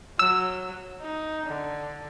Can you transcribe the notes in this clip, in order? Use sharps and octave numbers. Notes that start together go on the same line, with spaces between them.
F#3 E6
D#4
D3